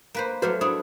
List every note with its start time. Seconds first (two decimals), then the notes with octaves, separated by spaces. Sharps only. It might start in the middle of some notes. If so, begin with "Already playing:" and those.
0.15 A#3 B4 C5
0.42 F#3 A3 F#4 B4 C5 D6
0.61 D4 E4 C5 C#5 D#6